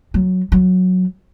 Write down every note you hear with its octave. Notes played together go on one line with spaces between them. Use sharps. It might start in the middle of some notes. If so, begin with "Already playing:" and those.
F#3
F#3